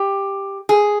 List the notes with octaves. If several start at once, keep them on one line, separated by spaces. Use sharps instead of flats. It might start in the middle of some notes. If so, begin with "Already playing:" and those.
Already playing: G4
G#4